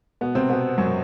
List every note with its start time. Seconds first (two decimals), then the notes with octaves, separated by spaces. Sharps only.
0.21 B2 B3
0.35 C3 C4
0.50 B2 B3
0.78 F#2 F#3